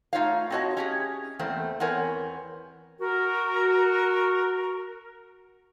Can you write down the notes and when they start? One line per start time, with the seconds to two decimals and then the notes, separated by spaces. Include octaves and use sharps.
0.13 A3 D#4 F4 C#5 F5
0.50 C4 D4 F#4 C#5 D#5 A5
0.77 C#4 G4 G#4
1.39 E2 A3 A#3 C4
1.80 E2 B3 C4 A#4 C#5 G#5
3.00 F#4 A#4